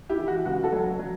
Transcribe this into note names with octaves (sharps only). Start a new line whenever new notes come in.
E4 G4
E3
F#4
C#2 F#4
F#4 A4
F#3
F#3